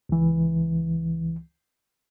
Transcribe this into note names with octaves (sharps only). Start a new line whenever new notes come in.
C#2 E3